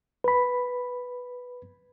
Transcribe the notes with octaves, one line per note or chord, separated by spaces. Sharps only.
B4 B5